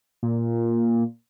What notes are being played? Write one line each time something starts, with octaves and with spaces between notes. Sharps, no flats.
A#2